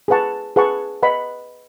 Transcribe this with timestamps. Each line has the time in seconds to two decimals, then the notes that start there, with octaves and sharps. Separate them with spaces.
0.08 G#4 B4 F#5 A5 C#6
0.56 G#4 B4 F#5 A5 C#6
1.03 B4 D#5 F#5 B5